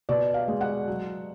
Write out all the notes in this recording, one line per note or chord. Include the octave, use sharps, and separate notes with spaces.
B2 D5
F5
G#3
F#5
F#3